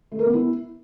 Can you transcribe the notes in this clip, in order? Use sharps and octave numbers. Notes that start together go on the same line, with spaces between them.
A3
A#4
B3
E4